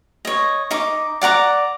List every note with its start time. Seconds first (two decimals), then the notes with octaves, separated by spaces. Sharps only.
0.25 C#5 D#5
0.71 D#4 D6
1.22 D5 F#5 A#5 D6